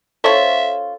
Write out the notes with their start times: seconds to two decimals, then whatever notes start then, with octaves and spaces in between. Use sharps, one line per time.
0.24 C#4 F4 A4 C5 C#5 E5